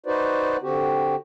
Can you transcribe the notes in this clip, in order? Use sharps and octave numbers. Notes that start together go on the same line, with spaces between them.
D#4 F#4 B4 C5 D5
D3 C4 F#4 G4